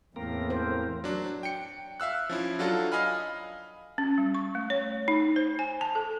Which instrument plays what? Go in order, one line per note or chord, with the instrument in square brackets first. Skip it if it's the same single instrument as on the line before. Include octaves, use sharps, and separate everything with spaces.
[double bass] E2 [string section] A2 [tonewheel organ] A#3 C4 A#4
[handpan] C5
[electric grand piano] F#3 D4
G5 C#7
E5 F5 E6 F#6
F3 C#4 E4
F#3 D4 F4 F#4 A4
D#5 F5 G#5 B5 F6
[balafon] C#4
G3
C#6
A3
C#5
D#4
C5
G#5
A5
A4